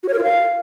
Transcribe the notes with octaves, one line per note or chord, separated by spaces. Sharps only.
F#4
C#5
A#4
F4
F5